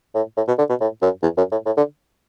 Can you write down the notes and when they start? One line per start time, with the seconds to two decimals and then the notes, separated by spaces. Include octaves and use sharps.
0.15 A2
0.37 A2
0.48 B2
0.58 D3
0.69 B2
0.81 A2
1.02 F#2
1.23 E2
1.37 F#2
1.52 A2
1.66 A2
1.77 D3